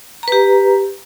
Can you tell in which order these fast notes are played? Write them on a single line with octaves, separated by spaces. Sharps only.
A#5 B4 G4